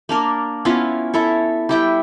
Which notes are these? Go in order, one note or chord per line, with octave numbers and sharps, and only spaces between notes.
A#3 D4 A#4
B3 C#4 E4 F4
E4 A4 C#5
G3 E4 G5